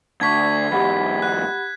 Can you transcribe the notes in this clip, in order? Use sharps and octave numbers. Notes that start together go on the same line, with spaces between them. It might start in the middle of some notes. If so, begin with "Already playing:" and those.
D2 D3 A5 C#6 G#6 B6
E2 G#2 G4 F#5 B5
F#6